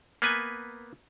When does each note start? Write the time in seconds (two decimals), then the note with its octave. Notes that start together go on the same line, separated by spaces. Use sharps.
0.22 A#3 B3 B4 G#5